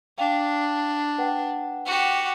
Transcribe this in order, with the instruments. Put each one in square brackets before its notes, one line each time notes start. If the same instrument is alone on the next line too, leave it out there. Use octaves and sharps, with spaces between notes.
[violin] D4 [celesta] F5 G5 F7
[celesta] B4 F#5 G5
[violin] F#4 G4